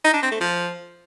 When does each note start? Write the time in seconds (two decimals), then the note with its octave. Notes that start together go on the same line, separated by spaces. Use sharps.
0.05 D#4
0.14 D4
0.23 C4
0.32 A3
0.41 F3